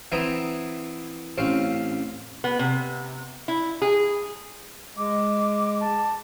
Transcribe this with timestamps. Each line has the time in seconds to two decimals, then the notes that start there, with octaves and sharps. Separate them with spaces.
0.12 E3 B3 C4 E4 A#5 D#6
1.38 A1 C4 C#4 F5
2.44 B3
2.59 C3
3.48 E4
3.82 G#4
4.97 G#3 D6
5.80 A5